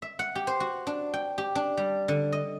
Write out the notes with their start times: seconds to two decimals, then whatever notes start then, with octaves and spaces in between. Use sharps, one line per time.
0.02 E5
0.19 F#5
0.35 G4
0.47 C5
0.60 F#4
0.87 D4
1.14 G5
1.38 G4
1.55 D4
1.77 G3
2.08 D3
2.32 D#5